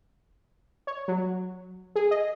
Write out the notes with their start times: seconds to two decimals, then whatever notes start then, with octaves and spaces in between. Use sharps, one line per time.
0.87 C#5
1.08 F#3
1.96 G#4
2.11 D#5